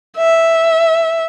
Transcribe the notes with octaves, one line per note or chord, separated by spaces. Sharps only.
E5